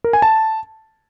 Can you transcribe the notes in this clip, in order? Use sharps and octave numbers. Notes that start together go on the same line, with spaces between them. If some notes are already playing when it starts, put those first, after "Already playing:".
A#4
G#5
A5